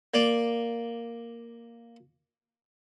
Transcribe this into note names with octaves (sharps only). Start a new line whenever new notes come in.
A#3 D5